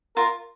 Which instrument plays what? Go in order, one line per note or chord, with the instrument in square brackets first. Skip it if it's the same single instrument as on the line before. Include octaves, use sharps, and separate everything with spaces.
[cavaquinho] F4 [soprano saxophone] A#4